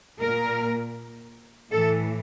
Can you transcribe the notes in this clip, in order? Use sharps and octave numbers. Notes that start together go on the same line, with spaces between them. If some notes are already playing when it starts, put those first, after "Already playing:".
A#2 A#4
A2 E3 A4